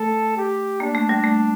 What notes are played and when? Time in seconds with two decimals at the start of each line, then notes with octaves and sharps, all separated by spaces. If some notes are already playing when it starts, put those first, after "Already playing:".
Already playing: A3 A4
0.37 G4
0.80 A#3 D4
0.95 A3
1.09 G3
1.24 A3